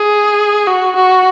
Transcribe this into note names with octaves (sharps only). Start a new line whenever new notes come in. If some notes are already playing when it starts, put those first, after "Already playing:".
Already playing: G#4
F#4
F#4